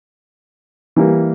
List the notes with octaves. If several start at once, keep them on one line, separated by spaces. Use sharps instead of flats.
E3 G3 A#3